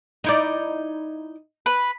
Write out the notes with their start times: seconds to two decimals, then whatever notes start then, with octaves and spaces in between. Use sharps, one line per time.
0.24 D#4 E4 D5
1.66 B4